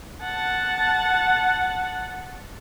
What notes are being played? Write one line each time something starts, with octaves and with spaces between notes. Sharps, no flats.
F#5 A5